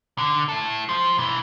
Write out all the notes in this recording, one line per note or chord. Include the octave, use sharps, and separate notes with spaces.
D3
E4 A4
F3
B1 E3